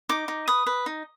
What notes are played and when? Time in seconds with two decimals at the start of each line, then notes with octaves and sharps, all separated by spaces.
0.09 D#4 D6
0.28 D#4
0.48 B4 D#6
0.66 B4
0.86 D#4